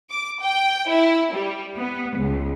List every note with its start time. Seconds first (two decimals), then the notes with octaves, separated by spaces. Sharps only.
0.11 D6
0.41 G5
0.90 E4
1.34 G3
1.76 B3
2.17 C#2